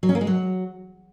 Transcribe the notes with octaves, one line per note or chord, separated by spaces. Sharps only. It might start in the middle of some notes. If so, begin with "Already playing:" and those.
F#3
C#4
A#3
G#3
F#3